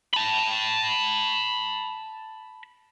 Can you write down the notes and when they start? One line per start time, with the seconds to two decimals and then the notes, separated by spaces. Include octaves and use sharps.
0.14 A5 B5